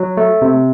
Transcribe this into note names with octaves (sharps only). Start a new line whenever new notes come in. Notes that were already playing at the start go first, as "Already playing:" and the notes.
Already playing: F#3
A3
C3